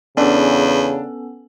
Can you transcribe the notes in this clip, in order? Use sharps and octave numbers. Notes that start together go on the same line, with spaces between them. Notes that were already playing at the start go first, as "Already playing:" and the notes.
E2 C#3 B3 C#4 D4 A4